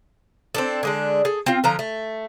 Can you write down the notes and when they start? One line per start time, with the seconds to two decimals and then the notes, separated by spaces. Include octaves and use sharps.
0.55 C4 D4 A4
0.83 D3 G#3 D4
1.25 G#4 A4
1.46 C4 F4
1.64 D3 F3 A#5
1.79 A3